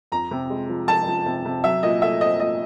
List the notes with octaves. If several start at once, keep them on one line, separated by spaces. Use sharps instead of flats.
F2 A#5
C3
G#3
F3
F3 A5
F3
C3
C3
F#3 E5
A#2 D#5
A3 E5
C4 D#5
A#2 D#5